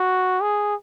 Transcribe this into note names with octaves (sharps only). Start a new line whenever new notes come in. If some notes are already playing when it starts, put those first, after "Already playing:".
Already playing: F#4
G#4